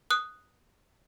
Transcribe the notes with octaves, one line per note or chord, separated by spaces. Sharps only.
D#6 F#6